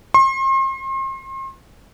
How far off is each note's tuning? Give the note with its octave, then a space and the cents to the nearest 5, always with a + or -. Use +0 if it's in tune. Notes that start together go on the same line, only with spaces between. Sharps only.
C6 +40